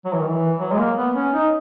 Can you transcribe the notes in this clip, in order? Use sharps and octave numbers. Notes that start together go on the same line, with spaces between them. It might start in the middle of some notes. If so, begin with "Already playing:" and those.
F#3
E3
D#3
E3
F#3
G#3
A#3
B3
C#4
D#4